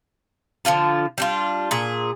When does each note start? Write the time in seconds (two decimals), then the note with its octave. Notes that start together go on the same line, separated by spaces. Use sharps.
0.65 D3 F3 F4 A5
1.18 G3 D4 F4
1.71 A#2 G#4